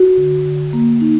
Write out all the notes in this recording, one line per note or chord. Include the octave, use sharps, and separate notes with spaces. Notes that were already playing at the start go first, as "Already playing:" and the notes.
Already playing: F#4
D3
D3
A#3
D#4